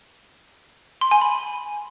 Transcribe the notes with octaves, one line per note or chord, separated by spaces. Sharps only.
C6
G#5
B5